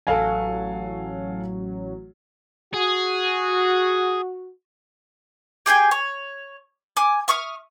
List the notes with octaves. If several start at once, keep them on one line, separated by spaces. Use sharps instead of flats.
A1 F#3 A4 F5 G#5
F#4 G#4
G4 G#4 G5 G#5
C#5
G#5 D6
E5 C#6 D#6 F6